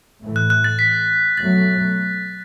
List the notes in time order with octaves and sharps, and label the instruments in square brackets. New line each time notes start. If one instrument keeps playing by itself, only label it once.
[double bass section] A2 E3 A3
[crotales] F#6
F#6
A6
B6
[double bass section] B2 F#3 A3 [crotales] A6